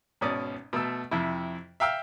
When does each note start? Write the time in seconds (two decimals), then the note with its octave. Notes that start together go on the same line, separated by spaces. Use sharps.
0.21 G#1 B2 C#4 D5 D#6
0.73 B2 A3 A4 E6
1.11 F2 C3 E4
1.80 E5 F5 G5 E6 F6